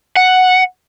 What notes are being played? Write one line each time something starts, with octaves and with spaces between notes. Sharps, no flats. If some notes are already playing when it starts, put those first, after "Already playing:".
F#5